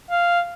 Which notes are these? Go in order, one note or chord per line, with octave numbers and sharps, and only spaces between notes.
F5